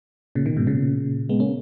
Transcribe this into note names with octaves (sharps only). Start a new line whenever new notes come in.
A#2 C#3
B2 D#3
G#2 B2
A#2 C#3
G#3 B3
A#3 C#4